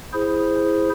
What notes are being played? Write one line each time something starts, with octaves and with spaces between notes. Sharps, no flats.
E4 G#4 C5